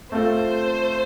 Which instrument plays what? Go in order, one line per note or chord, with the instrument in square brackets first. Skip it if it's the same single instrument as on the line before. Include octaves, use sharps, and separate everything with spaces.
[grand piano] A3 C4 F4 A4 [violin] C5